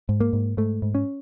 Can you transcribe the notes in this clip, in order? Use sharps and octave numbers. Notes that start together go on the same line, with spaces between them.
G#2
A#3
G#2
G#2 A3
G#2
C#4